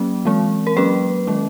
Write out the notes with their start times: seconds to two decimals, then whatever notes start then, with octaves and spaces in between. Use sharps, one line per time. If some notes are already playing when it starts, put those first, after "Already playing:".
Already playing: F#3 A#3 C#4
0.25 E3 G#3 C4
0.67 A#4
0.77 F#3 A#3 C#4 B4
1.27 D#3 G#3 C#4